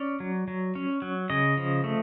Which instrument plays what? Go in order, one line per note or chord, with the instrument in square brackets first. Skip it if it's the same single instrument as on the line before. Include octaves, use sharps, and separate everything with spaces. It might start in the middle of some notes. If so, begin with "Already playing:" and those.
Already playing: [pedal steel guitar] C#4 D5
F#3
F#3
C#4
F#3
C#3 D#5
F3
A3